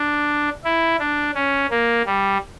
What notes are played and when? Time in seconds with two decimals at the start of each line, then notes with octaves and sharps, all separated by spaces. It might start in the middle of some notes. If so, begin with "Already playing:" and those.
Already playing: D4
0.64 E4
1.00 D4
1.35 C#4
1.70 A#3
2.06 G3